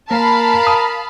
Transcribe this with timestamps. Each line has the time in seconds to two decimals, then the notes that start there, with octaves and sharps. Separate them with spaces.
0.11 A#3 A#4 F5 A5 B5
0.67 D#6